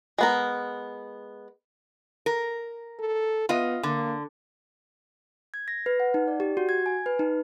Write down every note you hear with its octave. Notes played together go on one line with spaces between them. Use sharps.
G#3 B3 A#4
A#4
A4
B3 F4 D#5
D3 A#3
G#6
A#6
B4
F#5
D#4
D5
G4
F#4
G#6
G#5
B4
D#4